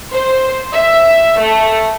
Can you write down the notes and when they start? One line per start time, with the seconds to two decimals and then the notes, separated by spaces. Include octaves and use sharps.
0.12 C5
0.73 E5
1.39 A3